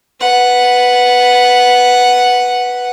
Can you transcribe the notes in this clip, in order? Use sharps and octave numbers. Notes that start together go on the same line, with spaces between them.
B4 F#5